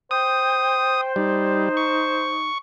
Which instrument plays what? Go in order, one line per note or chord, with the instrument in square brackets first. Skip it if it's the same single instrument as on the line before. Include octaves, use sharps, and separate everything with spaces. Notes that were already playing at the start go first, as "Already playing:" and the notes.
[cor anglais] C5 [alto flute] G5 [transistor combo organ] D#6
[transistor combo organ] G3 [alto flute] D#4
[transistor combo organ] C#6